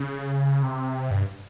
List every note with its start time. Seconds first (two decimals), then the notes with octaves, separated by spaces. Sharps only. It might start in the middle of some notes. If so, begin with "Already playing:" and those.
Already playing: C#3
0.63 C3
1.11 G2